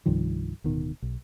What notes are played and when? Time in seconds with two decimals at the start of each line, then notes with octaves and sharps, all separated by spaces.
0.06 C2 G2 D#3 F3
0.64 D1 B2 D#3
1.02 B1